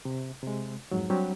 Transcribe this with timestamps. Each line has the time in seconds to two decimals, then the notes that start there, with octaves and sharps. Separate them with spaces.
0.05 C3
0.43 C3 G#3
0.91 F2 G#2 F#3
1.10 F#3 G3 C4 D4 G4